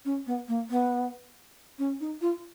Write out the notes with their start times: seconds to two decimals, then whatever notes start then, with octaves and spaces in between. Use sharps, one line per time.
0.05 C#4
0.27 B3
0.48 A#3
0.70 B3
1.79 C#4
2.00 D#4
2.21 F4